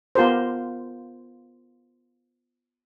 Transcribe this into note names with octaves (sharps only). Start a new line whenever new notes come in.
B3 F4 G4 A#4 C5